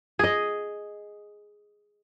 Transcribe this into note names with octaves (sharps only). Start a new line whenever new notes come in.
G#4 D#5